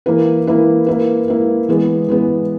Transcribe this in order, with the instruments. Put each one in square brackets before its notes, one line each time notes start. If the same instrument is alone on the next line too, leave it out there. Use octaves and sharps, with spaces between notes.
[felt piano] E3 A#3 E4 B4
E3 A#3 E4 B4
A#3 E4 B4
A#3 E4 B4
E3 G#3 B3
E3 G#3 B3